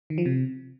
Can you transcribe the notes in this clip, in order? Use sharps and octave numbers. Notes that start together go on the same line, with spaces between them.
D#3
F3
C3